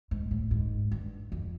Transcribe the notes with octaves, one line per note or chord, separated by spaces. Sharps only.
G#2
A2
G#2
G2
F2